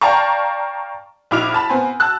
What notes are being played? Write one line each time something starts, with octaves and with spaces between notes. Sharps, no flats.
D5 F5 G5 A5 A#5 C#6
A#1 D#4 E4 D6 F6 F7
A5 B5
B3 C4 G#5
A5 E6 F#6